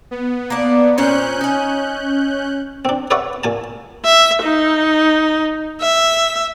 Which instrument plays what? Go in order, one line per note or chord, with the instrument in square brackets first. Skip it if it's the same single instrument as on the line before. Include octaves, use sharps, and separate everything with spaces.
[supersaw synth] B3
[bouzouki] A#3 D4
[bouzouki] A#2 C4 C#5 [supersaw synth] C#4 F#6 G6
[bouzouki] D#4 G#5
[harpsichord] C4 D4
B4 C#5 D5 E5 F#5 C#6
A#2 G#5 A5
[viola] E5
D#4
E5